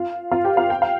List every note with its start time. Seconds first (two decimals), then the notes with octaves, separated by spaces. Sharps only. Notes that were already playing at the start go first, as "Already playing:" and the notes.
Already playing: F4 F5
0.31 F4 F5
0.44 G4 G5
0.57 F4 F5
0.70 G5
0.82 F5